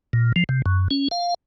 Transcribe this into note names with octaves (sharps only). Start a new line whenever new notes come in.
A#2
F3
C3
F#2
C#4
F5